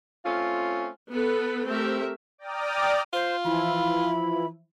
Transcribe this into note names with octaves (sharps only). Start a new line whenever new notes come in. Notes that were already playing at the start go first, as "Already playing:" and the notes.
A3 C4 C#4 F4
B3 A4 B4
A3 C4 G4 A#4 E5
D5 G5 A#5 D6 D#6 F6
F4 C5
E3 F3 E4 B5